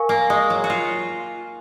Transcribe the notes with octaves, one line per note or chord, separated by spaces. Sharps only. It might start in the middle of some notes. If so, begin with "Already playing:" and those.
Already playing: A#4 F5 G#5 C#6
A#3
G#3
F#3
F#4
F4